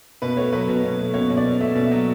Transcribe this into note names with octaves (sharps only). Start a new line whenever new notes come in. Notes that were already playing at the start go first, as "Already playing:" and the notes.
B2 B4
A3 C#5
F#3 B4
B2
B2
A3
B2 C#5
B2
D5
B2
A3 E5
B2
E5
F#3